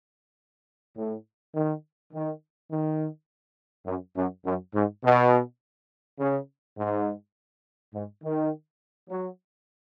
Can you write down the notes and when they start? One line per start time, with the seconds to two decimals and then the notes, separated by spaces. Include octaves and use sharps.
0.96 A2
1.55 D#3
2.13 D#3
2.71 D#3
3.86 F#2
4.16 F#2
4.46 F#2
4.74 G#2
5.04 B2
6.19 C#3
6.77 G#2
7.94 G#2
8.23 D#3
9.10 F#3